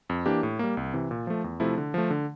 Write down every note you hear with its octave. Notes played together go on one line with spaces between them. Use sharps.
F2
E3 A#3 D4 G4
A2
G3 A#3
C2
C3 E3
A#2
F3 A3
E2
C3 F3 A3 E4
D3
F3 A3
D3